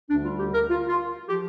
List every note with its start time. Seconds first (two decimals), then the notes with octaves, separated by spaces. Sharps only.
0.09 D2 D3 G3 D4
0.25 F4
0.38 G4
0.53 A#4
0.69 F4
0.88 F4
1.28 F3 G4